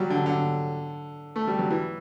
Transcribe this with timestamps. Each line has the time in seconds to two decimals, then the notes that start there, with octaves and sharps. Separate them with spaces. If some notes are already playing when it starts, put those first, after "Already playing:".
Already playing: F#3 G3
0.10 D3
0.26 D3
1.36 A3
1.47 G3
1.59 F#3
1.70 E3